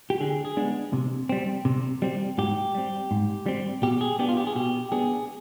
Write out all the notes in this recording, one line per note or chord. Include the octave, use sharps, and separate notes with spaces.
G4
D3 G#4
G#4
G#3 B3 D4
C3
G3 C4
C3
G3 C4
G#2 G4
G3 C4
G#2
G3 C4
B2 G4
G#4
B3 D4 G4
F4
G4
G#4
B2 G4
B3 D4 G#4